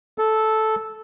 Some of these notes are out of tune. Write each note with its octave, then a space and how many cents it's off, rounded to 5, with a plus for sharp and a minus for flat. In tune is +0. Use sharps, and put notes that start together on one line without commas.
A4 -10